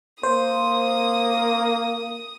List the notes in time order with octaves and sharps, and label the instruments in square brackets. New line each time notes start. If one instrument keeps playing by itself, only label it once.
[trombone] A#3 [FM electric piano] C5 [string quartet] D#6